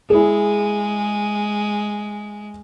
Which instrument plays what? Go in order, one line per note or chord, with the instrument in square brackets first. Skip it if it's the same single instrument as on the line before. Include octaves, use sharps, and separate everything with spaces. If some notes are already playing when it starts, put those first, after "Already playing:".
[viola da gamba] G#3 [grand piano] E4 G#4